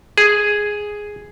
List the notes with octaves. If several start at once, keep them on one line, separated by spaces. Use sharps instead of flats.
G#4